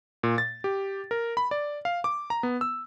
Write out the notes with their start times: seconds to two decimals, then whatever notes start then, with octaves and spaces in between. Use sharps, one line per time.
0.23 A#2
0.38 A6
0.64 G4
1.11 A#4
1.37 B5
1.51 D5
1.85 F5
2.04 D6
2.30 A#5
2.43 B3
2.61 E6